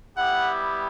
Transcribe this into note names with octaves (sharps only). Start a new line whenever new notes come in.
G3 B3 E4 G4 F#5